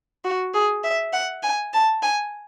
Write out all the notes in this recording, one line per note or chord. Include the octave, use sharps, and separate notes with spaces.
F#4
G#4
E5
F#5
G#5
A5
G#5